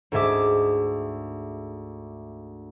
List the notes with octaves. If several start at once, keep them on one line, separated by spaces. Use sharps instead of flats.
D2 G#2 G#4 E5 D6